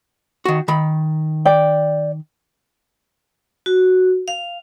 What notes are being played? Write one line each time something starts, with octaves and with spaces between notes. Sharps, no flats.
D#3 F#4
D#3 B5
D5 G5
F#4
F5